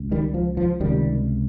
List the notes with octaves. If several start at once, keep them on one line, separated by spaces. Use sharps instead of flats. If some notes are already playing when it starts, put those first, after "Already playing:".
Already playing: C#2
D#3 G3
F3
F3
C#2 C3 D#3 G3